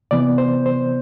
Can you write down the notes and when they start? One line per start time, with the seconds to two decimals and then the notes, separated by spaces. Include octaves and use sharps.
0.11 C3 E3 B3 D5
0.38 C5
0.66 C5